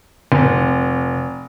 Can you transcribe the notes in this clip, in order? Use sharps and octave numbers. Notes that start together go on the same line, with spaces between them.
F1